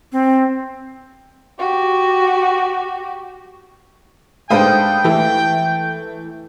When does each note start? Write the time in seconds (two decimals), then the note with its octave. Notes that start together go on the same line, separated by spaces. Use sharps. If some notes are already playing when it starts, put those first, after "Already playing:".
0.12 C4
1.59 F#4 G4
4.50 G#2 D4 A4 B4 C5 F5 G5 D#6
5.04 E3 A3